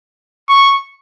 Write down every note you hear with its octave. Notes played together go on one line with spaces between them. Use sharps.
C#6